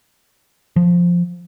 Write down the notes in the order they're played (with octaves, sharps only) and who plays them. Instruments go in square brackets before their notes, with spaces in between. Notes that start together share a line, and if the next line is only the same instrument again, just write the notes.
[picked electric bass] F3